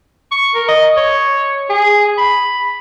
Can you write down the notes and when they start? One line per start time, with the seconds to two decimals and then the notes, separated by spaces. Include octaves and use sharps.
0.31 C#6
0.54 A#4
0.68 D#5
0.97 C#5
1.70 G#4
2.18 B5